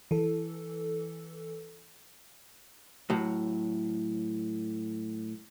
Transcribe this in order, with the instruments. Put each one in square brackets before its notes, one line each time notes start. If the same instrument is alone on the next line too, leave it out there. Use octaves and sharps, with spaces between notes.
[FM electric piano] E3 A4
[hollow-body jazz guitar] A2 F#3